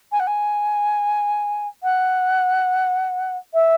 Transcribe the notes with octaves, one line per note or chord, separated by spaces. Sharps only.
G#5
F#5
G#5
F#5
E5